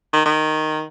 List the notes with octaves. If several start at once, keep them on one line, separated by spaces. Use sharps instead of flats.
D#3
D#3